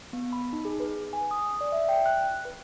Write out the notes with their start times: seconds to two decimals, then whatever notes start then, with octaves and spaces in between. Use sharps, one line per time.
0.13 B3
0.33 B5
0.53 D#4
0.65 G#4
0.80 B4
1.13 G#5
1.31 D#6
1.61 D5
1.72 E5
1.89 G5
2.06 F#6
2.45 B4